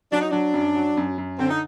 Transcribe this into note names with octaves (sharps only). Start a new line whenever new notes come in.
F#3 D4
D#4
F#3 D4
F#2
F#3
F#2
F#2
D3 C4
D#4